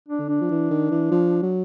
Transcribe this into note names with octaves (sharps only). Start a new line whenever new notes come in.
D4
D3
D4
F3
E3
D#3
E3
F3
F#3